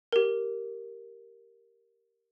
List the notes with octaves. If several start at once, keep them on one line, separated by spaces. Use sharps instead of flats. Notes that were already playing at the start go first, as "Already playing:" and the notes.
G4 A#4